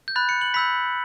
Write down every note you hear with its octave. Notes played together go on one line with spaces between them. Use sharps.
G6
B5 F#6 A6
C#7
F#7
B5 E6 G6 B6